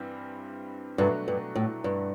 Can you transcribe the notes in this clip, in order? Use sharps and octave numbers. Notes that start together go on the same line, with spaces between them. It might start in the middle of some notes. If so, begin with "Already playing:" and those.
Already playing: G2 E3 G3 C4
G2 B2 F#3 A3 D4 F#4
G2
A2
G2